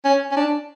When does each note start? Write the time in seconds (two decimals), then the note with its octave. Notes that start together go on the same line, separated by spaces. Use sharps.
0.05 C#4
0.32 C#4
0.37 D4